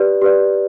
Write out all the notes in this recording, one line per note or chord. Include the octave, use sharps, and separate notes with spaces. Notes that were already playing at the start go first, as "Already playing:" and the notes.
Already playing: G4 B4 D5
G4 B4 D5